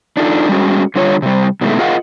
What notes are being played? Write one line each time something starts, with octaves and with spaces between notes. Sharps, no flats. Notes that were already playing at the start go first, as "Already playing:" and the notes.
D4 D#4 F4 A4
G3 G#3 C#4 F#4
D3 G3 F4 C#5
C3 G3
B2 D#3 F#3 G#3 A3
F4 G#4 A#4 D#5 F5 F#5